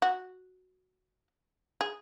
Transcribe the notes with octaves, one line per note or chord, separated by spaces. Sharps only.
F#4
G#4